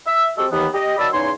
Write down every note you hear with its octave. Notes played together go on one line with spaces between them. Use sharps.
E5
G#3 C4 F#4 G4 A4
D#2 E3 B3
G4 D#5
D#3 F#3 D5 A5 B5 E6
E2 C#3 D#4 C#5 G#5 C6